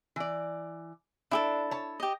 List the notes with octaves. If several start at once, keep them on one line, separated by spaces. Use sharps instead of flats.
E3 D5
D4 E4 G#4 A4
C#5 A5
G4 D#5